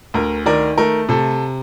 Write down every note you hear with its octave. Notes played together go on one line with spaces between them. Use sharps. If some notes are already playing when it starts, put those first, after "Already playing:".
D2 A#4
D#3 A#4 D5
A3 A#4
C3 A4